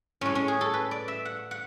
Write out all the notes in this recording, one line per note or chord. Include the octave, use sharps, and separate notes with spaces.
A2 G#3 C#4
C#4
G#4
A4
B4
D5
E5
F#5
F#5